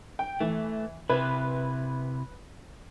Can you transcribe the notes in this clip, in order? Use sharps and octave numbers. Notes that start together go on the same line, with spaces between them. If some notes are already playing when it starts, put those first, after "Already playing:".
G5
E3 A3
C3 E4 B4